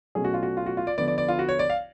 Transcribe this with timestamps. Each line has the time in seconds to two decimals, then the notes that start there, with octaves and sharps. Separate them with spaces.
0.15 B2 F#3 A3 C#4 G#4
0.25 F#4
0.34 F4
0.43 F#4
0.57 F4
0.66 F#4
0.77 F4
0.87 D5
0.97 D3 F3 B3 D5
1.08 D5
1.18 D5
1.28 F4
1.39 F#4
1.49 C#5
1.59 D5
1.70 F5